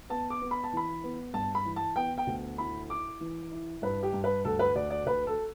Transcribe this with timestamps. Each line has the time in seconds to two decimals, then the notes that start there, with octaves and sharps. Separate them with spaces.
0.10 B3 A5
0.30 D6
0.41 B3
0.51 B5
0.64 A5
0.73 E3 B5
1.04 B3
1.34 G2 A5
1.55 B5
1.65 E3
1.76 A5
1.96 B3 G5
2.18 G5
2.27 D2
2.58 E4 B5
2.89 E4 D6
3.21 E3
3.52 E4
3.82 G2 B4
4.03 G4
4.13 G2
4.24 B4
4.45 D2 A4
4.59 B4
4.75 D2 D5
4.90 D5
5.06 D2 B4
5.27 A4